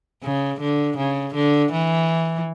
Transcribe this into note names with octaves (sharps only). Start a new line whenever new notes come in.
C#3
D3
C#3
D3
E3